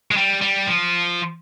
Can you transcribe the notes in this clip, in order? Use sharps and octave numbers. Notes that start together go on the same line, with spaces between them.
G#3
G3
G3
F3